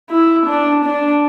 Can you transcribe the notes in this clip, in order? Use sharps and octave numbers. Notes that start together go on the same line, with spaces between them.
E4
D4
D4